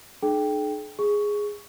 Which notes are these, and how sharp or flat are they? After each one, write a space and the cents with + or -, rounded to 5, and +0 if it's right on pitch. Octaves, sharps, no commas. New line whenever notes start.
D#4 -45 G#4 +45 G5 +0
G#4 -5 C#6 +10